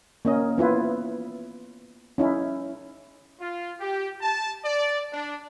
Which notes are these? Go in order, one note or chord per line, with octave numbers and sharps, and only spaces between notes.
A#3 C#4 D#5
B3 E4 F4 B4
C#4 D#4 E4
F4
G4
A5
D5
D4